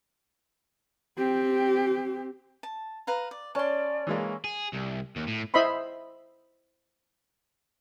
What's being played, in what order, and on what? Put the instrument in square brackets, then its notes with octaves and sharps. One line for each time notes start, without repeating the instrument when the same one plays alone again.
[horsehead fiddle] C4 G4
[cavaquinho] A5
B4 F5 A#5
D5
[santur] C#4 [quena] D5 [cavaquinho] A5 C6
[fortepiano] E3 G#3 A#3
[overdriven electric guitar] G#4
C2
D#2
A2
[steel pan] E4 C5 D#5 E5 B5 C6